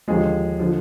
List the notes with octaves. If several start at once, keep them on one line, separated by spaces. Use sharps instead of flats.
D#2 D3 F3 G#3 G#4
D3 F3